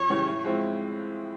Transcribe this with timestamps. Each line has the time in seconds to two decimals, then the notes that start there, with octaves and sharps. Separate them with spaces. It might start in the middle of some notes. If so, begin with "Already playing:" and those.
Already playing: F2 C#5
0.10 C#3 E3 G3
0.27 A2
0.44 F3 G#3 C4 E4